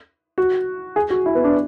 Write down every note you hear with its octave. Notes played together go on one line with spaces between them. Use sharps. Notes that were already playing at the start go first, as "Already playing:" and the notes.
F#4
G#4
F#4
E4
B3
D4